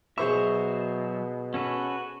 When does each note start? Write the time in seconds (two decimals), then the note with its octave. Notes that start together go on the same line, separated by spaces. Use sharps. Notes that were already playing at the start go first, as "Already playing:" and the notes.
0.18 B2 F#3 G#4 C5 E5 C#6
1.54 C#4 F#4 A4 B4